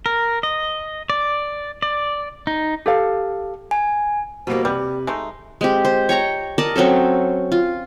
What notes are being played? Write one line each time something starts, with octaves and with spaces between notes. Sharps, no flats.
A#4
D#5
D5
D5
D#4
G4 A4 F5
G#5
B2 G3 A#3 F#4 B4 C5
C3 G3 G4 B4
G#3 A3 D#4
G#3 C4 G4
C5
C#5 G5 A#5 C#6
A#4 D5 D#5 A5
F#3 C4 C#4 A4
F4